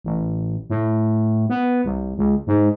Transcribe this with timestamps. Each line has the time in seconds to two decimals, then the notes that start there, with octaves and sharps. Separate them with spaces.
0.04 A1
0.70 A2
1.49 B3
1.84 C2
2.18 C#2
2.47 G#2